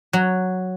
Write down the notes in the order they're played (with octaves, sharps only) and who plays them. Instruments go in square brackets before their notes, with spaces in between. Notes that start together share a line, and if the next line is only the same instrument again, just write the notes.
[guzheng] F#3